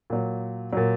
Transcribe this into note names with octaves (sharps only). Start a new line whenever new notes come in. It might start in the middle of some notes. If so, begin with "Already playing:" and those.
A#2 F#3
A#2 F#3